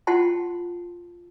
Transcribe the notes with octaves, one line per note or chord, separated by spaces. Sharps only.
F4 F#5 G5 A5 C6